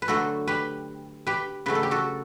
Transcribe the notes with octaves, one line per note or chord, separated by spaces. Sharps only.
B4
D3 F#3 A3 F#4 A4
G4 B4
G4 B4
C#3 F#3 A3 B4
A4
G4
F#4 A4